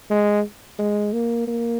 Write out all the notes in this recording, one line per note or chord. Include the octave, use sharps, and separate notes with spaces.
G#3
G#3
A#3
A#3